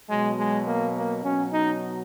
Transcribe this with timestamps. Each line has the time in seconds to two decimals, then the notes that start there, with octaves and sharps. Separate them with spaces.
0.09 B2 F#3 G#3
0.38 G#3
0.66 A#3
0.95 A#3
1.24 B2 F#3 C#4
1.51 D#4